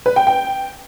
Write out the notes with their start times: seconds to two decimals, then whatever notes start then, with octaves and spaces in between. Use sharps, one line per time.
0.06 B4
0.16 G5
0.27 G5